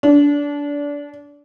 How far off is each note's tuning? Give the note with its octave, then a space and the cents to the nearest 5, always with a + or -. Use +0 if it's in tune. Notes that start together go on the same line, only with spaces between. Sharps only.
D4 -25